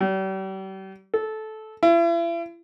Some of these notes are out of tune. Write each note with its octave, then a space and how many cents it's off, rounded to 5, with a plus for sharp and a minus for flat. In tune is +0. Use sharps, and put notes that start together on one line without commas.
G3 -40
A4 -15
E4 +40